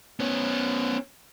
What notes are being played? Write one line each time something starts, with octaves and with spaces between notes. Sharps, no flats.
B3 C#4